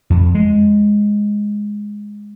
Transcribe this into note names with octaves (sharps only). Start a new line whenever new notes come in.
F2
G#3